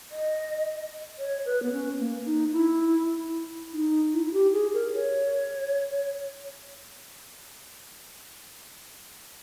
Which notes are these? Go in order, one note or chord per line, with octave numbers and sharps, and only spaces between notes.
D#5
C#5
B4
B3
C#4
A#3
D#4
E4
D#4
E4
E4
G4
G#4
A#4
C#5